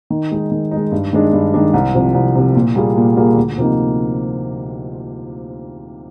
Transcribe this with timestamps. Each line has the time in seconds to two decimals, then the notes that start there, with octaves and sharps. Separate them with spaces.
0.10 D#3
0.31 G#3 D#4
0.52 D#3
0.71 G#3 D#4
0.92 G2
1.13 D#3 G#3 D4
1.33 G2
1.54 D#3 G#3 D4
1.74 C2
1.95 C3 F3
2.14 C2
2.35 C3 F3
2.55 A#2
2.75 G3 A#3 F4 G#4
2.97 A#2
3.16 G3 A#3 F4 G#4
3.37 D2
3.58 C3 F3 A#3 D#4